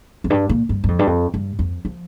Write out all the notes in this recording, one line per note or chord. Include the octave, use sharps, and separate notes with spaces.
F2
G2
A#2
G2
G2
F2
G2
F2
G2
F2
F3